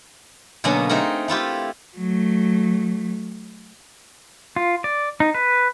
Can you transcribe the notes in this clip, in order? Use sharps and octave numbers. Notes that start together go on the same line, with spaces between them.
B2 D3 F#3 A#3 B3 C#4
A3 C4 D#4 G#4 A#4
A3 E4 F4 G4
F#3 A3
F4
D5
D#4
B4